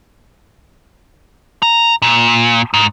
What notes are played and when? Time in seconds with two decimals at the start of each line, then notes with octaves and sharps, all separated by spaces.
1.62 A#5
2.02 A#2
2.74 G#2